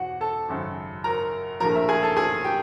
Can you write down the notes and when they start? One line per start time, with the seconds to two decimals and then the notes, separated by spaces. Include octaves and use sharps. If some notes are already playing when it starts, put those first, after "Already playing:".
Already playing: E2 B2 F#4 F#5
0.21 A4 A5
0.49 G#1 F#2 C#3
1.04 A#4 A#5
1.60 A#1 A2 F3 A#4 A#5
1.75 E5
1.89 G#4 G#5
2.03 A4 A5
2.17 G#4 G#5
2.44 G4 G5